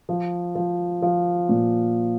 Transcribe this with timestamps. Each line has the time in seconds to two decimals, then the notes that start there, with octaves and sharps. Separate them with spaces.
0.09 F3
0.55 F3
1.02 F3
1.49 A#2